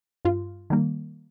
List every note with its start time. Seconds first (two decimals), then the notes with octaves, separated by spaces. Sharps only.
0.25 G2 F4
0.70 D#3 G3 A#3